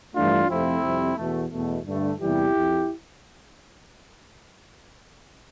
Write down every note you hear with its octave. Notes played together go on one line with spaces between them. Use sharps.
G2 E3 A3 D4 F4
F2 C3 F3 A3 C4 E4
F2 C3 G3
E2 B2 A3
E2 B2 A3
G2 D3 A3
E2 C3 E3 G3 E4 G4
F2